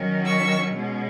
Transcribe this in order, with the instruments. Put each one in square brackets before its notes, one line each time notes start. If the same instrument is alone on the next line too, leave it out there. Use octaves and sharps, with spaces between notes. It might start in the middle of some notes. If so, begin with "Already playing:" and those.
Already playing: [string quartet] D#3 F#3 C#4
C#6 E6
B2 G#3 C#4